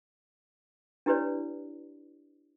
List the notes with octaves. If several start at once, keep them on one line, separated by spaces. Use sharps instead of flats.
D4 E4 G4 B4 C#5 D5